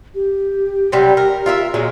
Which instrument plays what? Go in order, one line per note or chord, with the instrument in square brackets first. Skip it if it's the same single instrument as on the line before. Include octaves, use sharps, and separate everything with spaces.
[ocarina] G4
[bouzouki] C3 F#3 G3
A#4
F4 A#4 E5
A#2 F#3 G#3